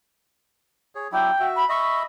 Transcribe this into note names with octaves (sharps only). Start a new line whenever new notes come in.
G#4 C#5
F#3 D4 E4 G5
F#4 E5
B5
D#5 E5 B5 C#6